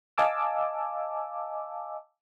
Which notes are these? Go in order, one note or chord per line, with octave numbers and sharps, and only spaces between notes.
D#5 F5 G#5 A5 D6 E6